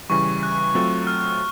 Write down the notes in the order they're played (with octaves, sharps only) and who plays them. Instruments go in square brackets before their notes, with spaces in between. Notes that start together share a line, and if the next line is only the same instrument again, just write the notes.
[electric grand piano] C#3 E3 G3 [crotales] C#6
[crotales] F#6
[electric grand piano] F#3 A3 C4 F4 A4
[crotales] F6